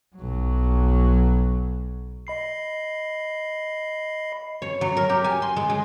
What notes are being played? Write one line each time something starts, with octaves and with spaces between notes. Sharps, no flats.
B1 F#3
D#5 B5 C7
C#5
F#3
A#4
G4
G#5
C6
G#3
G#3